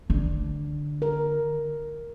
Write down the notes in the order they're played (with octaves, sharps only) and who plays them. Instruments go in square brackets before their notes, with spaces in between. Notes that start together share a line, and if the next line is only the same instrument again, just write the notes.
[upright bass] D3
[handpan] A#4